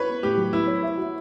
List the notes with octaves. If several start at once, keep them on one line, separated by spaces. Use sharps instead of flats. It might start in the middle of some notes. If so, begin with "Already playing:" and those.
Already playing: B4 C#5
B3
A2 G4
F#3
B3 E4
C#5
E5
F#4